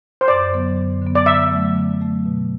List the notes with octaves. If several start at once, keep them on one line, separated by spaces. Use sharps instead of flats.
C5
F#2 D5
D3 F#3 B3
F#2
D3 F#3 B3
D5
D3 E5
F#3 A3
D3
F#3 A3
B2